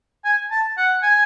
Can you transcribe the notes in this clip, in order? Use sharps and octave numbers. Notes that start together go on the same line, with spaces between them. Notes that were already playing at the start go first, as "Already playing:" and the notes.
G#5
A5
F#5
G#5